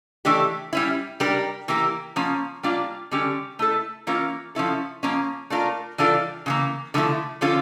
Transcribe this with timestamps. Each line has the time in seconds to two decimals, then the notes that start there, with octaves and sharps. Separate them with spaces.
0.25 E3 A3 D4 G4
0.73 G3 C#4 E4
1.20 G3 D4 G4 A#4
1.68 E3 A#3 E4 G4 A#4
2.16 F3 A#3 C#4
2.63 G3 A#3 D4 F4
3.11 D3 G3 C#4 G4
3.59 A3 E4 A4
4.07 E3 A#3 C#4 F4 A#4
4.55 F3 C#4 E4 A4
5.03 F3 A#3 C#4
5.50 A3 D4 F4 A#4
5.98 E3 G3 D4 F4 A4
6.46 C#3 E3 A#3
6.94 D3 F3 A3 E4
7.41 D3 F3 C#4 F4 A4